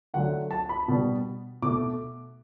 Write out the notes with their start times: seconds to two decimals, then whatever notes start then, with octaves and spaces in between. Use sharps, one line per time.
0.14 D3 F#3 A3 F#5
0.51 A5
0.69 B5
0.88 B2 G3 B3
1.62 B2 A3 D6